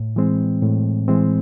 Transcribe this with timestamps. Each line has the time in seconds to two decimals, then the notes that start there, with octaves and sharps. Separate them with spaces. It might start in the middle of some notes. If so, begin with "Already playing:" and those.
Already playing: A2
0.16 E3 G#3 C4
0.62 A2
1.08 E3 G#3 C4